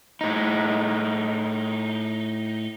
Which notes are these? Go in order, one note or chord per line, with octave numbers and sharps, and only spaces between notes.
A2 D#4